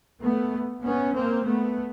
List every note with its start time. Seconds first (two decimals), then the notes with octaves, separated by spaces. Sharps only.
0.22 A3 B3
0.84 B3 C#4
1.15 A#3 C4
1.47 A3 B3